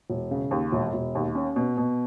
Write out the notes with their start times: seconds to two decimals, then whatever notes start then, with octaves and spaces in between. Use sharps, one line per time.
0.10 E1
0.31 C#3
0.51 D#2
0.72 E1
0.93 E1
1.15 D#2
1.35 C#4
1.56 B2
1.78 B2